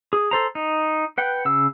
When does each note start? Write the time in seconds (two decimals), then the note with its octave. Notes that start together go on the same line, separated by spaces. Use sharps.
0.13 G#4
0.31 A4 C5 A#5
0.55 D#4
1.18 B4 F#5 G5
1.45 C#3 E6